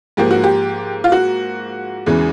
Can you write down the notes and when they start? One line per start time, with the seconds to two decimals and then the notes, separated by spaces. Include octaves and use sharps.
0.17 G#2 F3 A#3 G4
0.31 F#4
0.44 G4
1.04 F4
1.12 F#4
2.06 E2 C#3 E3 G#3